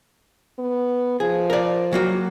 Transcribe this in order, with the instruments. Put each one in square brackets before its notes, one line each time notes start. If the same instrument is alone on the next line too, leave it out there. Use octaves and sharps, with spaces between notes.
[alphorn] B3
[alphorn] F3 [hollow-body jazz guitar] G#4
[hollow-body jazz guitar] A#4 D5
F#3 A#3 F#4